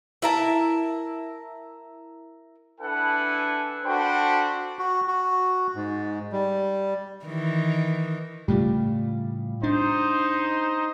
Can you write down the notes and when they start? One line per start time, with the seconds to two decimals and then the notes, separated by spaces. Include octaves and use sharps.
0.22 E4 A#4 A5
2.80 D4 E4 A4 B4 F#5 G#5
3.85 D4 F#4 A4 C5 G5 B5
4.79 F#4
5.08 F#4
5.75 G#2
6.32 G3
7.25 D#3 E3
8.48 A2 C#3 G3 A3 F4
9.63 D4 D#4 C5